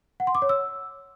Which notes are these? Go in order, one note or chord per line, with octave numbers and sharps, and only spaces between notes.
F#5
C6
D6
C#5
E6